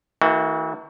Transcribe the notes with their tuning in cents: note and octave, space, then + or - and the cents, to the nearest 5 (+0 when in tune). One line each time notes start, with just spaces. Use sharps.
E3 -40 A3 +40 F#4 +0